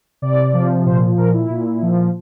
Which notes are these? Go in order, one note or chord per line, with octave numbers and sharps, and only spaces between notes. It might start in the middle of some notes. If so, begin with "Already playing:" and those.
C3 D5
F3
A#2 C5
A#2 A#4
E4
A#2
F3